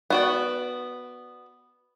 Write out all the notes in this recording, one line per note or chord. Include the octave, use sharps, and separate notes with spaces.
B3 F#4 D5